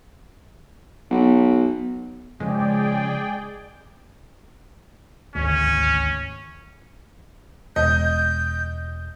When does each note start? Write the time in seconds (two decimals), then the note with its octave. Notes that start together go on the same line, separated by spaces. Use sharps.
1.11 B1
2.40 C#3 F3 G#3 G#4 D5 G5
5.35 G#1 D2 C#4
7.76 E1 D#5 G6